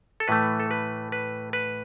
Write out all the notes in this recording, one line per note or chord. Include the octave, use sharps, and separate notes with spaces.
A4
A2 E3 A3 B4
A4
B4
B4
B4